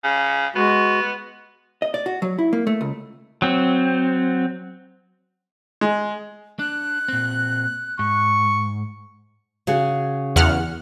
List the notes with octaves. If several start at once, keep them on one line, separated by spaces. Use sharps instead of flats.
C#3
G#3 B3 F#4
D#5
D5
F#4
F#3
E4
A#3
A3
C#2
F#3 C4
G#3
D4 F#6
A#2 C4
G#2 C#6
C#3 F#4 G#4
E2 F#5 F6